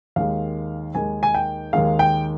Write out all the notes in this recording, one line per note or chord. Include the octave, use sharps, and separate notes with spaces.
D#2 D#3 G#3 F5
D#2 D#3 G#3 G#5
G#5
G5
D#2 D#3 G#3 F5
G5